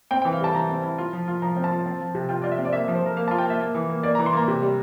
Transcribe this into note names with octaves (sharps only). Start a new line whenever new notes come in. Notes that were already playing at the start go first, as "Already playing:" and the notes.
C4 G5
E3 G5
F5
G3 A5
E3 A#5
C4
E4
F4
F3
F4
F3 A#5
C4
A5
F4
C4
F3
C3
F4 G5
F4 D5
E5
C4
D5
A#3 E5
F3 E5
C5
F3 A#4
A#3 F5
F4 A5
G5
A#3 E5
A#3
E3
A#3
A#3 D5
E3 A#5
C6
A#3 A#5
C3
G3